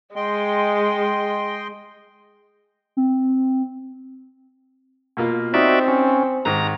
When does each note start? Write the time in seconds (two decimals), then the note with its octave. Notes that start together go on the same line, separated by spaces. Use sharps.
0.16 G#3 D#5 G5 C6
2.97 C4
5.17 B2 A#3 F4
5.54 C4 D#4 F#4 D5 E5
5.88 C#4
6.45 G#2 D#3 A#5